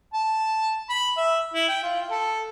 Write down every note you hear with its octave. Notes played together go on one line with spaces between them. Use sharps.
A5
B5
E5
E4
G5
F4
A4